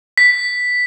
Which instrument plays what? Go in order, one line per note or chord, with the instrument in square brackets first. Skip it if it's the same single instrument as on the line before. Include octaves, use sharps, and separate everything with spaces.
[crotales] B6